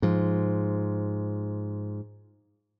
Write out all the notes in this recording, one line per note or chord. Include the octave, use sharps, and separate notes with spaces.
G#2 F3